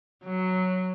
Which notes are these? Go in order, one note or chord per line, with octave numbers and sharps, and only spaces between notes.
F#3